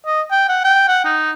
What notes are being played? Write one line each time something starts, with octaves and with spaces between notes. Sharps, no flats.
D#5
G5
F#5
G5
F#5
D#4